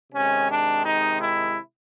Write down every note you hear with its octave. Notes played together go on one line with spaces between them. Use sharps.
C3 D#3 G#3 C#4
D4
D#4
E4